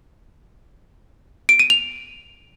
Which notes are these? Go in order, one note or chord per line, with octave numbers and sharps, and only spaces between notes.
D7
D#7
F7